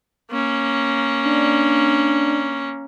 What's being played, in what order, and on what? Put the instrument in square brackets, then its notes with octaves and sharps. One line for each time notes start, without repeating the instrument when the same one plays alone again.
[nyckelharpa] A#3 C#4
[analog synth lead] D4